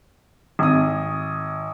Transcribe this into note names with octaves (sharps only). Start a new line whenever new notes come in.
G#1 D#6